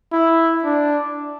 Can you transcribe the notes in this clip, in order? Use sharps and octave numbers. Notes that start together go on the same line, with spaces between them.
E4
D4